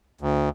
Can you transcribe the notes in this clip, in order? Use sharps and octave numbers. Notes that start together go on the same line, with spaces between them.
D2